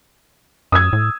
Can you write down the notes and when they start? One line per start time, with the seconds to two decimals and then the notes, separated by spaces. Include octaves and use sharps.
0.72 F#2 D#6 E6 G#6
0.93 A2